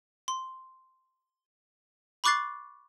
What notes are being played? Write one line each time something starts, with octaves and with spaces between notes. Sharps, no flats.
C6
B5 C#6 D6 F#6 A6 C7